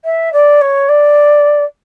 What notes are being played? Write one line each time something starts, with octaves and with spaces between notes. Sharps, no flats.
E5
D5
C#5
D5